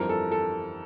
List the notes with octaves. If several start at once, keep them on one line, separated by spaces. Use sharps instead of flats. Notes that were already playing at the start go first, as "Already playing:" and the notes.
Already playing: G1 F2 E3 G3 C4 A#4
A4
A4